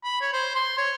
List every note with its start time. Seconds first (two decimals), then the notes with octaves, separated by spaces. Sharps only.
0.04 B5
0.21 C#5
0.33 C5
0.56 C6
0.78 C#5